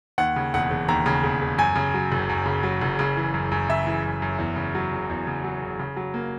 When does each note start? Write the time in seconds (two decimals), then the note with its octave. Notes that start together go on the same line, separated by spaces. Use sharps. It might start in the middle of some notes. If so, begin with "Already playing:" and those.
0.18 D#2 F#5
0.36 C#3
0.54 E1 F#5
0.70 E1
0.89 D#2 A#5
1.06 C#3
1.23 E1
1.42 E1
1.58 F#2 G#5
1.76 C#3
1.94 F#3
2.12 F#1
2.29 F#2
2.46 C#3
2.63 F#3
2.81 F#1
2.99 C#3
3.17 E3
3.34 F#2
3.51 F#2
3.68 C#3 E5
3.86 E3
4.05 F#2
4.22 F#2
4.39 E2
4.56 C#3
4.75 F#3
4.92 F#1
5.09 E2
5.27 C#3
5.44 F#3
5.62 F#1
5.79 C#3
5.97 F#3
6.14 A#3